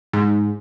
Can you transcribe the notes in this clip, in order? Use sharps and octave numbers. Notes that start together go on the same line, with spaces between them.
G#2